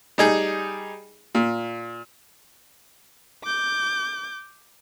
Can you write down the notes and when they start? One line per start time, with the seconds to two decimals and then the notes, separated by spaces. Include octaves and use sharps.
0.18 G3 D#4 G#4
1.35 A#2
3.44 D6 G6